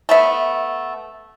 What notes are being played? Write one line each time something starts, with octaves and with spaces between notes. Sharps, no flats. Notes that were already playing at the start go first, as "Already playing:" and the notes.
A3 B3 E5